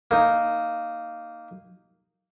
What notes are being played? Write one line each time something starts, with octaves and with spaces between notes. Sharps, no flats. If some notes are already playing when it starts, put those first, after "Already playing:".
A#3 D#4